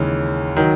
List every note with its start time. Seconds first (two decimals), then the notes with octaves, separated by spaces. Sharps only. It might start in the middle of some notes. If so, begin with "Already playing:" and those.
Already playing: D#2 C#3 E3 G#3 C#4
0.57 D#3 F#3